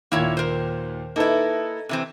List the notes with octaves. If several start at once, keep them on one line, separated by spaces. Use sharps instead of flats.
D#2 A#2 A#3 E4 C#5
A#4 C5
A#3 D#4 E4 A4 B4
C3 E3 C4